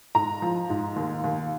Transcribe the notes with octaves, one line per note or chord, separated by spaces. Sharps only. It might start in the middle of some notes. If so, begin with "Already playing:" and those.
G#2 A#5
F3
G#2
D#2
D#2